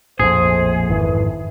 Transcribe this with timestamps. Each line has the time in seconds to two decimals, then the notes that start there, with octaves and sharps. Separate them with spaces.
0.20 A#1 F2 A2 G#4 C5
0.89 G#1 F2 E3